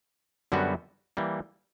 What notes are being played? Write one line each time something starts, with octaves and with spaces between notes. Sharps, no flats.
F#2 D3 G3 B3 F#4
E3 G3 A#3